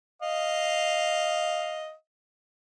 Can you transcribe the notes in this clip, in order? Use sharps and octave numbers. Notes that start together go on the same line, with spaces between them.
D#5 F5